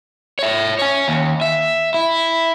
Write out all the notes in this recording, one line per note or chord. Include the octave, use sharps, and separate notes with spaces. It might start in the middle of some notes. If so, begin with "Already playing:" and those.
C#5 E5
C#5 G#5
D#2
E5
E4